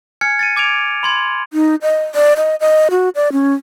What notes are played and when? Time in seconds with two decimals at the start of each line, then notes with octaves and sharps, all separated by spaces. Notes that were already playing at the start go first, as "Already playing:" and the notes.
0.21 G#5 F6 G#6 C#7
0.39 A6 C#7 D#7
0.56 D6 G#6 D7 F7
1.03 B5 C6 G#6
1.52 D#4
1.82 D#5
2.15 D5
2.37 D#5
2.60 D#5
2.91 F#4
3.15 D5
3.32 C#4